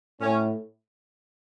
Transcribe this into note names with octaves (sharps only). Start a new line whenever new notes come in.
A2 C#4